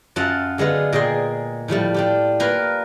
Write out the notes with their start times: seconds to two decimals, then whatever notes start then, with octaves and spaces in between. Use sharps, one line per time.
0.16 F#2 F4 F5 F#5 A5
0.58 D3 G#3 B3 F4
0.93 A#2 G#3 G#4 G5 C6
1.68 A2 F3 G3 A3
1.94 D4 F4 G4
2.40 A#3 F4 A#4 B4